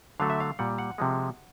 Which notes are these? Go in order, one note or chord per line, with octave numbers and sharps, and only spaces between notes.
D3 F#3 A3 F5
E5
F5
A#2 G3 F#5
F#5
C3 F3 G#3